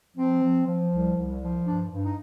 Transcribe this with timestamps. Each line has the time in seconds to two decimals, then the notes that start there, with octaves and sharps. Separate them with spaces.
0.17 F3 C4
0.42 F3
0.67 F3
0.92 C2
1.17 C2
1.42 F3
1.67 G2 D4
1.92 G2
2.05 D#4